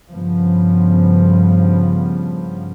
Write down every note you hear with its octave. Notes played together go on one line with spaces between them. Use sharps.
G2 C#3 F3 B3